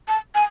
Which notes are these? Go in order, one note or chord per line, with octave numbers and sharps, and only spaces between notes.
A5
G#5